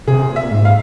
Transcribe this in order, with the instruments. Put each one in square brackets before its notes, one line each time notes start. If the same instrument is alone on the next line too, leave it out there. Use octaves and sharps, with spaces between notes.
[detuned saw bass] C3 [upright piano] G#4
[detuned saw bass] A#2
[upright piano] E5
[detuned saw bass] G#2
[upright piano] F5